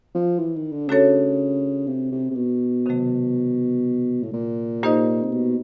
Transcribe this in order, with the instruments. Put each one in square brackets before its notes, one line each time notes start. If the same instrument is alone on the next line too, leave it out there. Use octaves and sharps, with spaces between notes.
[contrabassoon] F3
E3
D#3
D3
[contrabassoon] C#3 [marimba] A3 D4 F#4 A4 C#5
[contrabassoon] C3
C3
C3
B2
[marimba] C3 D#3 F#3 A3
[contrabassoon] A2
A#2
[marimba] A#3 D#4 G4 C5 D#5
[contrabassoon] C3
B2